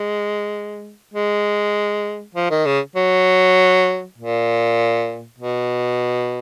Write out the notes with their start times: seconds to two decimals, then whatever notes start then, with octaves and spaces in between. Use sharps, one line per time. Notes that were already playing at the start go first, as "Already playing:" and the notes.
Already playing: G#3
1.14 G#3
2.35 F3
2.50 D#3
2.66 C#3
2.96 F#3
4.18 A#2
5.38 B2